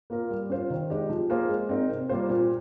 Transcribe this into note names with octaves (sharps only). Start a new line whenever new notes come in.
A#3 F4 A#4
G3
C#4 F4 C5
D#3
G#3 D#4 G4
F3
A#3 F4 G#4 C5
G#3
C4 D#4 A#4
C3
G3 A#3 F4 C5
A#2